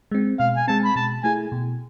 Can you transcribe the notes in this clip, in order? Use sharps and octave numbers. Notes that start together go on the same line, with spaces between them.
G#3 C4
B2 F5
G#5
G#3 C4 A5
B5
B2 A5
A3 E4 G#4 G#5
B2